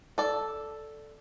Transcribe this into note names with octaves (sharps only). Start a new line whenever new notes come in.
A4 D5